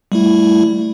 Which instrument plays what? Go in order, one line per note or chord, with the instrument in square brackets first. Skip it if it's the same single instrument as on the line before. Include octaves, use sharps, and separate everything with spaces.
[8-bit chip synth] G3 A3 E4